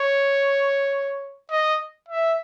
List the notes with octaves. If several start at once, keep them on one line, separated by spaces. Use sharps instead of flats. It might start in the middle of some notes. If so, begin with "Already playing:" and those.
Already playing: C#5
D#5
E5